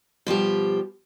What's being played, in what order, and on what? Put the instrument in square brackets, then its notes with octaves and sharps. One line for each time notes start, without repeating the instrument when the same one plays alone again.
[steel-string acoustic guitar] B2 F3 G3 G4